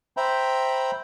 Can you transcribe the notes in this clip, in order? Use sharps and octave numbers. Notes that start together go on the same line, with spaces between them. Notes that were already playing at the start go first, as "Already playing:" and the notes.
C5 E5 G5 A#5 B5